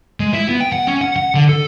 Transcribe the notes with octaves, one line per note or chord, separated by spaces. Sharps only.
G#3
E4
B3
G5
F#5
C#4
F#5
F#5
D3
A4